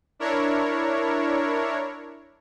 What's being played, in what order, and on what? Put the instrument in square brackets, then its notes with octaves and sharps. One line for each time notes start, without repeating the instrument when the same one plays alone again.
[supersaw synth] D4 E4 A#4 C#5